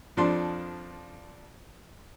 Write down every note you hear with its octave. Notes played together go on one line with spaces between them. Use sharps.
F2 F3 D4 C6